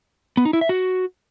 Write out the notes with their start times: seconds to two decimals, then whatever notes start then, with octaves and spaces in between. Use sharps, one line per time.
0.37 B3
0.45 D#4
0.53 E4
0.61 E5
0.69 F#4